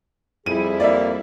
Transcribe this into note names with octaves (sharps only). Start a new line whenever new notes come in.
F2 G3 E4 G#4 D#7
A#3 D5 E5